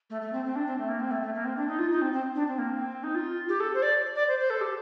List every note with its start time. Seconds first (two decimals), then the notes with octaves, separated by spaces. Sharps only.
0.10 A3
0.21 A3
0.32 C4
0.45 C4
0.55 D4
0.66 C4
0.78 A3
0.88 A#3
1.00 C4
1.11 A3
1.22 A3
1.34 A#3
1.45 C4
1.56 D4
1.68 D#4
1.78 F4
1.91 D#4
2.01 C4
2.12 C4
2.35 D4
2.47 C4
2.58 A#3
2.69 C4
3.03 D#4
3.14 F4
3.49 G4
3.60 A4
3.74 C5
3.82 D5
4.15 D5
4.27 C5
4.39 C5
4.50 A4
4.61 G4